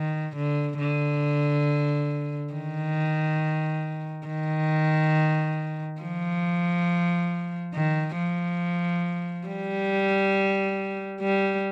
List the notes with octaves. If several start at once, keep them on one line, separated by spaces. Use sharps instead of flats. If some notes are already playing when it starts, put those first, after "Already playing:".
Already playing: D#3
D3
D3
D#3
D#3
F3
D#3
F3
G3
G3